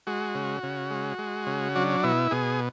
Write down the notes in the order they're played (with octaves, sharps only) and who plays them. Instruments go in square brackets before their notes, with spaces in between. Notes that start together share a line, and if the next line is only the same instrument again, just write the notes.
[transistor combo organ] G#3 F#4
C#3
C#3
G#3
G#3
C#3
F#3 D4
B2 E4
B2 G#4